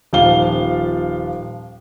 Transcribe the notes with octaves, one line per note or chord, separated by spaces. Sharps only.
D#1 F3 F4 F5 G7